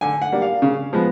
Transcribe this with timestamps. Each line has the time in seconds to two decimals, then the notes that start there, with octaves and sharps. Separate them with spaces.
0.01 D3 G#5
0.22 F#5
0.32 G3 A#3 D4
0.42 F5
0.62 C#3
0.93 F3 G#3 B3